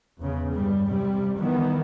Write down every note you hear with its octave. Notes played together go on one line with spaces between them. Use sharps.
E2 C#3
G2 G3
C3 G3
D#3 E3 B3